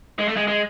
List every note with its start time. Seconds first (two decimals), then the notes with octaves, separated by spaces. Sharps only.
0.19 G#3
0.28 A3
0.36 G#3
0.48 G#3